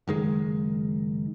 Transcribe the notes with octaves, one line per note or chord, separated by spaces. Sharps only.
F#1 D#3 G#3